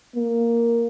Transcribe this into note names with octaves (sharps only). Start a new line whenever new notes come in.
A#3